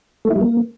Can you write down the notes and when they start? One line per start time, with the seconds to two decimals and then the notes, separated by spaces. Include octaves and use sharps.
0.25 A3
0.30 E4
0.36 G3
0.41 A#3